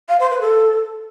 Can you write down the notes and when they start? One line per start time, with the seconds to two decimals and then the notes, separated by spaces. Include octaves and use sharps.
0.09 F5
0.20 C5
0.30 B4
0.41 A4